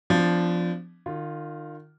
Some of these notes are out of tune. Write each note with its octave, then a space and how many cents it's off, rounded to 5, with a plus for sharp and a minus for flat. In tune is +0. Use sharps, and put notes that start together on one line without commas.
F3 +0 B3 +45 D4 +0
D#3 -35 F4 +0